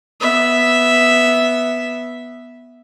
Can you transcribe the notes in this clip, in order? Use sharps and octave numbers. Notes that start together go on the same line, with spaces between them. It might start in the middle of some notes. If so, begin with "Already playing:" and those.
B3 E5